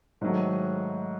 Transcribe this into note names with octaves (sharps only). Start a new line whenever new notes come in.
G#2 D#3 F#3 A3